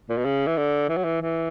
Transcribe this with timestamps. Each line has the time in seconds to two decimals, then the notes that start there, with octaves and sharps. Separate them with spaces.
0.09 A#2
0.17 B2
0.25 C#3
0.47 E3
0.57 D3
0.89 E3
0.97 F#3
1.04 E3
1.22 E3